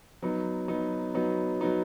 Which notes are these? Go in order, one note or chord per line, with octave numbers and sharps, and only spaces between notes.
F#3 B3 D#4
F#3 B3 D#4
F#3 B3 D#4
F#3 B3 D#4